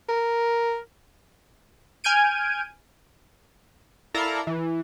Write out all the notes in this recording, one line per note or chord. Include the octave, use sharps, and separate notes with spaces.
A#4
G#5 F6 G6 G#6 D7 D#7
E4 A4 A#4 D5 F5 A#5
E3